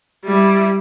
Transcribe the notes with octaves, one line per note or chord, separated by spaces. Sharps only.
G3 E4